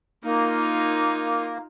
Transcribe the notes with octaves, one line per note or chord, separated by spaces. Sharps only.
A#3 D#4 F4